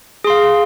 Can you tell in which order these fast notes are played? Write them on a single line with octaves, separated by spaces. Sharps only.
G#4 C6 F5